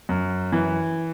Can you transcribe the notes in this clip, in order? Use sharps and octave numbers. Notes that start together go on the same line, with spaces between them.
F#2
E3